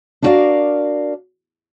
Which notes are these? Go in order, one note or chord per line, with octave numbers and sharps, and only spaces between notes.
D4 E4 F#4 A#4 D5 F5